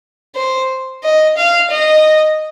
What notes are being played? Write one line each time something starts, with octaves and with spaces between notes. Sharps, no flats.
C5
D#5
F5
D#5